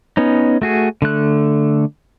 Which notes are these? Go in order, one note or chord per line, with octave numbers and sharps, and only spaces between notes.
B3 C#4 D#4
A3 F#4 G#4
D3 A3 F#6